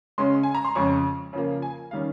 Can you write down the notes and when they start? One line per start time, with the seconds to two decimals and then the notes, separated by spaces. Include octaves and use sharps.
0.18 C#3 G#3 C#4 C6
0.43 G#5
0.55 A#5
0.65 C6
0.75 F2 C#3 G#3 C#4 C#6
1.33 C#3 F3 A#3
1.62 G#5
1.91 D#3 G3 C#4 F5